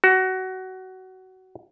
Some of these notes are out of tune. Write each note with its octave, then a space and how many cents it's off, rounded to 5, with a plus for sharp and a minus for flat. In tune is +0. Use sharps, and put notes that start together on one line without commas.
F#4 +20